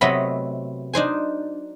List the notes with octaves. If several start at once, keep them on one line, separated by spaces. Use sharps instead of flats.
C3 F#3 A3 B3 D#5 B5
D4 D#4 C5 G#5